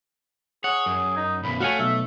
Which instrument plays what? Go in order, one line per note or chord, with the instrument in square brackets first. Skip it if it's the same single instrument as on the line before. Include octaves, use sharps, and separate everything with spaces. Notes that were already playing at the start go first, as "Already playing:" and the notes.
[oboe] G#4 [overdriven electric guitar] C#5 [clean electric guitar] F#5
[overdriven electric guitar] F#2
[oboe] D#4
[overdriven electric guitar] B1 F#2 [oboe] B5
[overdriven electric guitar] A3 [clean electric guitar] F#4 C#5 G#5 [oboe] F5
[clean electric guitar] B1 [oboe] E5